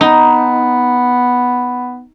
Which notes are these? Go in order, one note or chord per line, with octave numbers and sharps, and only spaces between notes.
B3 D#4